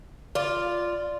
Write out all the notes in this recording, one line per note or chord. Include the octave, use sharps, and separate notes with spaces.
F4 D5